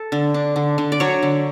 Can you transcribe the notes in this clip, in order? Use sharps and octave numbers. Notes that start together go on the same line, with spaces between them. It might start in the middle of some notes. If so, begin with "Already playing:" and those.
Already playing: A4
D3
D4
D3
D3
D5
F#3 C#5
D3